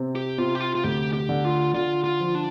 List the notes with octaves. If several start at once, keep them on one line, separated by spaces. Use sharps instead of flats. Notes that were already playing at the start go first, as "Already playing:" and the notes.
Already playing: C3 C4
G4
C3 F4
G4
F4
F4
D2 G4
G4
D3
F4
D3 F4
F4
F3
D4